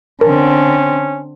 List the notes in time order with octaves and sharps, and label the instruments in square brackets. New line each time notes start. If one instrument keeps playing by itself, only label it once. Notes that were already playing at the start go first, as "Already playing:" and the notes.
[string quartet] D3 C4 [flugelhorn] C#4 [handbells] A#4